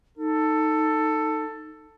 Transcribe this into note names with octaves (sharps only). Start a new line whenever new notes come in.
D#4 A4